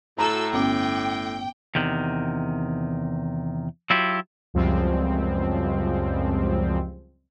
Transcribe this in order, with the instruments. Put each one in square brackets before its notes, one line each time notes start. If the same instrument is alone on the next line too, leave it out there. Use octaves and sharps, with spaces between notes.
[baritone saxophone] A2 [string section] F#4 A4 E6 [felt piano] A#5
[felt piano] G1 C#4 D6 [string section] G5
[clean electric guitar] E2 C3 D#3
F#3 E4 F4 G4
[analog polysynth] C#2 F#2 F3 G3 G#3 C4